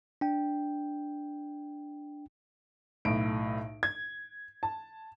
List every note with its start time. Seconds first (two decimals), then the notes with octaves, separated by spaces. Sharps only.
0.21 D4 G5
3.05 B1 A2 D7
3.83 G#6
4.63 A5